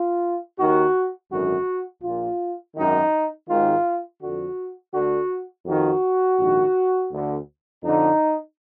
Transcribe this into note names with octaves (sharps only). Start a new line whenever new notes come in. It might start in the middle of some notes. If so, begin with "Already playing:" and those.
Already playing: F4
D#2 D#3 F#4
G#1 F#2 D3 F#4
A#1 A#2 F4
G#1 F#2 D#3 D#4
G#1 G#2 D#3 F4
F2 D3 F#4
D2 D3 F#4
F2 D#3 F#4
A#1 G#2 D#3
D2 D3
F2 D3 D#4